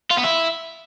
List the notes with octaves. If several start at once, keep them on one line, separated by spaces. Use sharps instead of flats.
F4
B3
E4